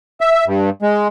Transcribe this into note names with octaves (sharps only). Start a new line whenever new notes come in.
E5
G2
G#3